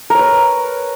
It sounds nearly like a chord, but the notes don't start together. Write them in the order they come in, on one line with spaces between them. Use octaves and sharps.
A#4 C#5 B4